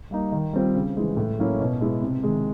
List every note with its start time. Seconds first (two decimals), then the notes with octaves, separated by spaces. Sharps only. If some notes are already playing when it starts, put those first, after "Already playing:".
0.11 G3 A#3 D#4
0.32 D#3
0.53 G3 C4 F4
0.75 C#3
0.97 E3 G#3
1.17 A2
1.39 F#3 A#3 C#4 E4
1.60 B2
1.81 G#3 B3 E4 G#4
2.01 C3
2.23 D#3 G#3